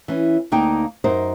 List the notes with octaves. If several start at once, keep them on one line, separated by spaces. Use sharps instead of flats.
E3 C#4
D2 A#3 D#4 G5
F#2 D#4 A#4 C5